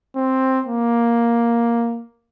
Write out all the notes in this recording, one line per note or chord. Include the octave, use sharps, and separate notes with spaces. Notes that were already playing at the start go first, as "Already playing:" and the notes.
C4
A#3